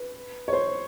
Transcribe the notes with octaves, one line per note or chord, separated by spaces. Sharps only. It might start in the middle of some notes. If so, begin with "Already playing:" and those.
Already playing: B4
C#5
C5